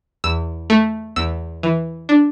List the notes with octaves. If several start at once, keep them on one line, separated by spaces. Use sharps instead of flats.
E2 E6
A3
E2 E6
E3
D4